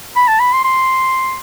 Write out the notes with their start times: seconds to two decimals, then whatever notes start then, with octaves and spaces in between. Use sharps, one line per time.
0.16 B5
0.28 A5
0.40 B5
0.53 C6
0.64 C6